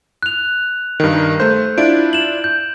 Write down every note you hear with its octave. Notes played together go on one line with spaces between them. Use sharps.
F#6 F7
G2 D#3
A3 C5 G6
D4 E4 F4 D7
E7 F#7
G6